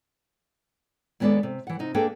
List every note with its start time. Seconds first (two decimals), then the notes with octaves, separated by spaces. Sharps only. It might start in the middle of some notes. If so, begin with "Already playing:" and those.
1.20 D#2 G#3 B3 D4 A4 D5
1.43 C3
1.67 E3 F#5
1.79 C3 D#4
1.94 A#3 D4 G#4 A4 B4 G5